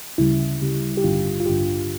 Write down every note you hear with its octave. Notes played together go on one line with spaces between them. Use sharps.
D2 C#3 G3 E4
D2 C#3 G3
G4
A1 G2 D3 F4
F4
A1 G2 D3 G4